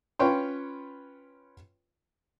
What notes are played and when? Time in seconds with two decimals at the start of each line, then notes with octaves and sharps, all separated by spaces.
0.19 C#4 F4 B4 C#5 G5 C6